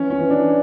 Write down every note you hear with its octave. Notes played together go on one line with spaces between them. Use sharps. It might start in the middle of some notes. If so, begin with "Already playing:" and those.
Already playing: E3 C#4
C#4
E3
D4